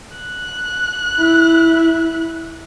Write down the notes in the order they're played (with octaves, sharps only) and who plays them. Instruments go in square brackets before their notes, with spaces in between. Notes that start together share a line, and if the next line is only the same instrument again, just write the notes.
[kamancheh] F#6
[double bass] E4